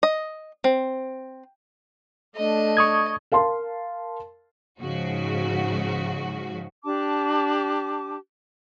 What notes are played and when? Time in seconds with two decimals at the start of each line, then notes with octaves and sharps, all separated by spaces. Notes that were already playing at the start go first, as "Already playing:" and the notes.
0.03 D#5
0.64 C4
2.36 A3 D4 D#5
2.77 C#6 D#6 G#6
3.32 A#4 F5 A5 C6
4.81 G#2 C#3 F3 F#4
6.84 D4 G4 A5 D6